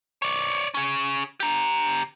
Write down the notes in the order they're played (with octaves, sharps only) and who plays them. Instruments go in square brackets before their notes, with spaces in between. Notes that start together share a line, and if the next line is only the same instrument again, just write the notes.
[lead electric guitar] C#5 D5
C#4 G#4
G4 A#5